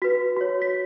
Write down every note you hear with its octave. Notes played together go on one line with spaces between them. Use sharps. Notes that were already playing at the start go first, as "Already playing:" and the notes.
F#4 B4 B6
F#4 C#5
B6